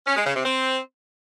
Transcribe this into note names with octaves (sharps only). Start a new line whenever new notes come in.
C#4
G#3
C#3
C3
C4